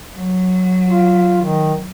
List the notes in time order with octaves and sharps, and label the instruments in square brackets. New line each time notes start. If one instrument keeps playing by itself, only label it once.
[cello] F#3
[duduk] F4
D#3